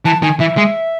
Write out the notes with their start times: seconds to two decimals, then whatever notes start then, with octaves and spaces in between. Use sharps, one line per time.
0.05 E3 A5
0.23 D#3 G#5
0.40 E3 E5
0.57 G#3